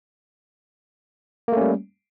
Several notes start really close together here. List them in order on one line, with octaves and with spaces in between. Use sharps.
A#3 A3 C#4 G3